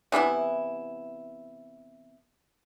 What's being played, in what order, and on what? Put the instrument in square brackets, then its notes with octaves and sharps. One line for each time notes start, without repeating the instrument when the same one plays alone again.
[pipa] C3 E3 B3 E4